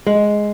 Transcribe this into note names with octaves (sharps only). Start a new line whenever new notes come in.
G#3